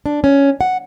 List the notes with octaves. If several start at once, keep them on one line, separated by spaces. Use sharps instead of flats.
D4
C#4
F#5